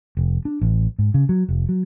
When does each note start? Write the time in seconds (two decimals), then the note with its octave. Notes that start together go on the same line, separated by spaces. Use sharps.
0.17 F1
0.45 D4
0.61 A1
0.99 G#2
1.14 C#3
1.29 F#3
1.49 F1
1.69 F#3